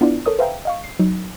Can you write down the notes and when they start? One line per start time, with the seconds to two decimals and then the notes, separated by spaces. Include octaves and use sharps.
0.01 B3 D4 E4 F4 D5
0.26 A4 A#4 C#5 D#6
0.39 B4 C5 E5 F5 G5 A#5
0.65 D#5 F5 C#6
0.84 C7
0.99 F#3 D#4